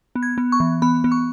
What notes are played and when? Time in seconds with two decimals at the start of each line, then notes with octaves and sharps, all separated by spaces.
0.15 B3
0.23 G#6
0.38 B3
0.52 C#6
0.60 E3
0.82 B3 B5
1.04 B3
1.12 C#6